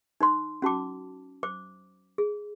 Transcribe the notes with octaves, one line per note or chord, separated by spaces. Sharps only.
D#4 C5 C6
C#4 F#4 A5 D6
C5 D6
G#4